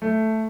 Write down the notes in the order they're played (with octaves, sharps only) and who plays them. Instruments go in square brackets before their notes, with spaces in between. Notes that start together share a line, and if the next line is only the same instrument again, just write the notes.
[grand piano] A3